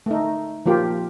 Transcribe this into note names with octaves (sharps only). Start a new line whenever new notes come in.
A3 D#4
F3 A#3 F4 G4